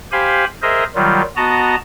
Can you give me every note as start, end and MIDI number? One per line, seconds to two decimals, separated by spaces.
0.12 0.45 67
0.12 0.45 72
0.12 0.45 77
0.12 0.45 80
0.12 0.45 83
0.62 0.84 68
0.62 0.84 70
0.62 0.84 72
0.62 0.84 75
0.62 0.84 76
0.95 1.22 51
0.95 1.22 54
0.95 1.22 55
0.95 1.22 65
1.36 1.75 59
1.36 1.75 66
1.36 1.75 75
1.36 1.75 81
1.36 1.75 82